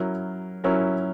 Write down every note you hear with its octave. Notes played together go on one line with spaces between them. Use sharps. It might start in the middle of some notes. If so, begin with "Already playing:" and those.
Already playing: F#3 C#4 E4 A#4
F#3 C#4 E4 A#4